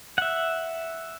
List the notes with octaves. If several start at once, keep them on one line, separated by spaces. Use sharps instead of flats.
E5 F#5